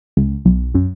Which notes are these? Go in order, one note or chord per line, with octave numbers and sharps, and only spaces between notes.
C#2
B1
F#2